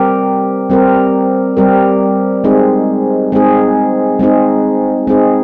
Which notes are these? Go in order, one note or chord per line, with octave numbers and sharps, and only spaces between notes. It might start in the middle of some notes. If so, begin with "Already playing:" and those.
Already playing: G3 C4 G4 A#4
G3 C4 G4 A#4
G3 C4 G4 A#4
G#3 C4 D#4 G#4
G#3 C4 D#4 G#4
G#3 C4 D#4 G#4
G#3 C4 D#4 G#4